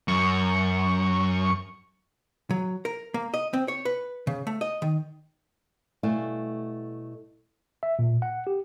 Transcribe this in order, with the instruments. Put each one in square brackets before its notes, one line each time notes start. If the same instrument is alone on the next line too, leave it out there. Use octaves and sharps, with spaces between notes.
[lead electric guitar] F#2 [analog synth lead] C#6
[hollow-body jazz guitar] F#3
A#4
A#3
D#5
C4
C#5
B4
C#3
A3
D#5
D#3
[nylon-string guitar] B2 G3 A3 E4 F5 G#5
[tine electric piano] E5
A#2
F#5
G4